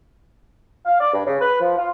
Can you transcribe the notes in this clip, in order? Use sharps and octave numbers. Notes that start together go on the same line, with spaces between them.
F5
D5
G2
C#3
B4
F3
F4